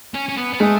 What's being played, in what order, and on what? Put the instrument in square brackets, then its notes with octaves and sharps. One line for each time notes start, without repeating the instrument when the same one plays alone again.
[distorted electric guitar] C#4
C#4
B3
B3
[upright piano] G#3 [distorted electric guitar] A3